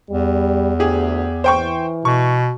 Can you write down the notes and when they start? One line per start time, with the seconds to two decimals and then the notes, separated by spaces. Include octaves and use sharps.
0.10 E2 G3
0.80 D2 G4 G#4
1.44 E3 C5 G5 C#6
2.05 B2 C#6